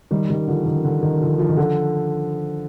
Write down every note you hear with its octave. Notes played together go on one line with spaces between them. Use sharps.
D#3 G3
D#3 G3
D3 F3
D#3
D3
D#3
D3 F3
F3
D#3
D3 F3